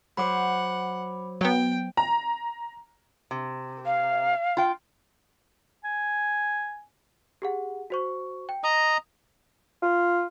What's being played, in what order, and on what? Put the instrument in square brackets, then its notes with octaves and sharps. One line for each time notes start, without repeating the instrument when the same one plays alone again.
[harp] F#3 C5 [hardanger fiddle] F#5 [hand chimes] B5 D6
[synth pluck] F#3 B3 [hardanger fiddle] G5
[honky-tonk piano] A#5
[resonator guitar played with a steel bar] C3
[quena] F5
[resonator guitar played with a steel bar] F4 G5
[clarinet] G#5
[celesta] G4 G#4 F#5
F#4 C5 C#6
G5
[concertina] D#5 A#5 [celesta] D#6
[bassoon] F4